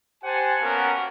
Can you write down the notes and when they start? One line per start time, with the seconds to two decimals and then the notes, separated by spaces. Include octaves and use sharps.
0.24 G4 C5 F#5 G#5 A5
0.61 A#3 B3 C#4 F#4 A#4